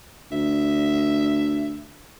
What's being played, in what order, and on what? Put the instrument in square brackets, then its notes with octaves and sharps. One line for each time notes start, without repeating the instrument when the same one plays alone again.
[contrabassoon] D2 [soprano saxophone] E5